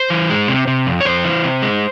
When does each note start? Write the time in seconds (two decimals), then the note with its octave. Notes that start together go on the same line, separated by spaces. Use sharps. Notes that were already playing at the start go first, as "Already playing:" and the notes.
Already playing: C5
0.10 E3
0.30 G#3
0.48 C3
0.67 C3
0.87 F2
1.01 C#5
1.05 F2 C5
1.25 E3
1.44 C3
1.62 G#3